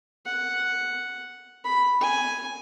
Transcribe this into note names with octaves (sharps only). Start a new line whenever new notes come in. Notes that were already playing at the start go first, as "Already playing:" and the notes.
F#5
B5
G#5